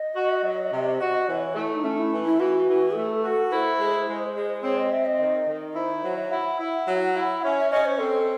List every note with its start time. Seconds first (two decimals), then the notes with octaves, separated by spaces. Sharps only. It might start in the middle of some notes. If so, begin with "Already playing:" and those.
Already playing: D#5
0.16 F#4
0.43 F#3
0.71 C3
1.00 F#4
1.27 E3 C#5
1.55 A3 E4
1.76 D#4
1.83 A3 C#4
1.98 E4
2.11 E3
2.25 E4
2.39 E3 F#4
2.68 E3
2.95 A3 A4
3.24 F#4
3.52 E4 C5
3.80 G#3
4.08 G#3
4.35 G#3
4.63 C4 C#5
4.77 D#5
4.92 C4 E5
5.06 D#5
5.20 D#3
5.48 D#3
5.75 E4 C5
6.03 F#3 C5
6.17 E5
6.32 E4 F#5
6.60 E4
6.87 F#3
7.15 E4
7.44 C#4 E5
7.58 E5
7.71 C#4 D#5
7.85 C5
7.99 C4 A4